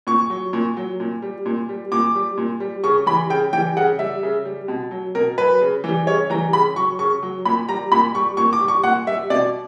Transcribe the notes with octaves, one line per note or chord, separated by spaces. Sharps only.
A#2 C#6
F#3
A#2
F#3
A#2
G3
A#2
G3
A#2 D6
G3
A#2
G3
C#3 C#6
E3 G3 B5
C#3 G5
E3 G3 G5
C#3 F#5
G3 E5
C#3
G3
B2
F#3
B2 A#4
F#3 B4
C#3
E3 G3
C#3 C#5
E3 G3 A#5
C#3 B5
F#3 C#6
C#3 C#6
F#3
A#2 B5
G3 A#5
A#2 B5
G3 C#6
A#2 C#6
D6
G3
C#6
A#2 F#5
G3 E5
B2 D5